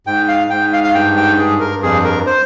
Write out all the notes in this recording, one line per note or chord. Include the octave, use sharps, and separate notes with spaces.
G#2 G5
F5
G#2 G5
F5
F5
G2 G5
G5
G2 G#4
A#4
F2 G#4
A#4
C5